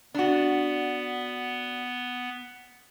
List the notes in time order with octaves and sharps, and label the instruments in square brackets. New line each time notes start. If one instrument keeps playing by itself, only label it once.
[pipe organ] B3 [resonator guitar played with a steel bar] D4 F#4